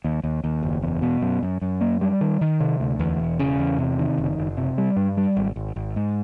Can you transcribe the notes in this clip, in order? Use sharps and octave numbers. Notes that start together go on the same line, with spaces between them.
D#2
D#2
D#2
F#1
E2
B2
F#2
F#2
F#2
A#3
G3
D#3
D#3
C3
D2
E2
E1
C#3
E2
C3
D#3
F#1
F#1
C3
G3
G2
G3
G#1
G#1
G#1
G#2